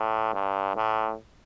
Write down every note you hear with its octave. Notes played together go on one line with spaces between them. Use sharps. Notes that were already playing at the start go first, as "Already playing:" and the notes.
Already playing: A2
G2
A2